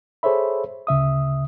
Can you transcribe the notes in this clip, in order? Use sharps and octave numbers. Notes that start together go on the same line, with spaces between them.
G#4 A4 C5 C#5 E5 B5
D2 C#3 E5 D#6